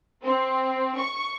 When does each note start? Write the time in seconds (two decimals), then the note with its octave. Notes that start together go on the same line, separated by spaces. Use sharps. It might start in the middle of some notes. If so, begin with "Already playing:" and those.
0.23 C4
0.96 C#6